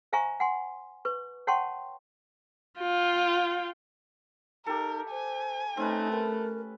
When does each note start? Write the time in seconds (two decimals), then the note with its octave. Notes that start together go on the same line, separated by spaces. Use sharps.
0.13 C5 E5 F5 G#5 A#5 C#6
0.40 F#5 G#5 C6
1.05 B4 C#6
1.47 C#5 F#5 G5 A5 C6 C#6
2.80 F4 G5
4.66 D#4 G4 A4 A#4
5.11 C5 G#5
5.77 A3 C4 C#4 D#4 B4
6.12 A#4 B4